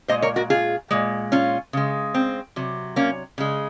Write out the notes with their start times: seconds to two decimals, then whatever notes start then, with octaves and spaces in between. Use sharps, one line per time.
0.08 A#2 G#3 C5 D#5
0.22 A#4 C#5
0.36 F#4 A#4
0.50 F4 G#4
0.91 A#2 G#3
1.32 C#4 F4
1.73 C#3 G#3
2.14 C4
2.56 C3 F#3
2.96 A#3 C#4
3.38 C#3 G#3